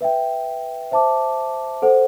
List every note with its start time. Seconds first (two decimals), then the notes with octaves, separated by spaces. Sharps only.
0.01 B4 E5 G5
0.91 C5 E5 A5 D6
1.82 A4 C5 F#5